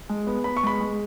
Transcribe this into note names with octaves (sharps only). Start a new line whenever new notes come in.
G#3
B3
B3 B5
C#6
G#3 B5
G#3